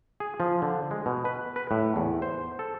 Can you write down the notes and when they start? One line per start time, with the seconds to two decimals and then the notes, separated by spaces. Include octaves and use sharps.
0.20 G#4
0.40 F3
0.62 D3
0.91 G#3
1.06 B2
1.25 B4
1.56 B4
1.71 A2
1.96 E2
2.22 C5
2.59 A4